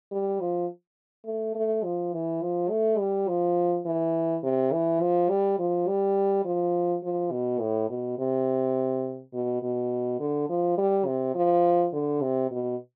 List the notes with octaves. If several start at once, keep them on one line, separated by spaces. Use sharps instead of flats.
G3
F3
A3
A3
F3
E3
F3
A3
G3
F3
E3
C3
E3
F3
G3
F3
G3
F3
F3
B2
A2
B2
C3
B2
B2
D3
F3
G3
C3
F3
D3
C3
B2